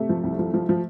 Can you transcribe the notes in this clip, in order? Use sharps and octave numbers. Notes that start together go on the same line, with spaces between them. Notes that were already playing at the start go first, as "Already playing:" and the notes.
Already playing: C3 A3
F3
C2
F3
F3
F3